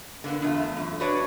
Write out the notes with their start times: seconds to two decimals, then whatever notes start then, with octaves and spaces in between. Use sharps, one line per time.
0.24 D3 A#3 B3
0.42 E2 A3 F4
0.77 F#2
1.00 D4 F#4 B4 C#5 D5